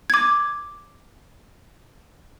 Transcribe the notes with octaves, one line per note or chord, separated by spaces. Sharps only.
D6 G#6